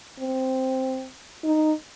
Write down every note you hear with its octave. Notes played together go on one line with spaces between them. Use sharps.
C4
D#4